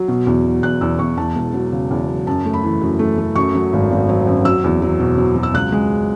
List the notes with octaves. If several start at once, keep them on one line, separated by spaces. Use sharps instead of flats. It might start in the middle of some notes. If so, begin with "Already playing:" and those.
Already playing: F#3
B2
E2
B2
E2 F#6
E2 E6
E2 C#6
E2 A5
E1
F#3
C#3
E2
F#3
F#2 A5
A3
B5
E3
F#2
A3
A3
F#2 C#6
F#3
G#1
G#1
F#3
F#2
F#3 E6
E2
F#3
B2
F#3
F#3
E6
C#2 F#6
G#3